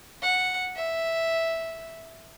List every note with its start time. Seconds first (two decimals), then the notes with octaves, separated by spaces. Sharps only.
0.22 F#5
0.76 E5